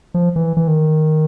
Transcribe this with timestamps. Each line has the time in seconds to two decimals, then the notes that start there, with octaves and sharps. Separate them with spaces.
0.14 F3
0.36 E3
0.57 E3
0.68 D#3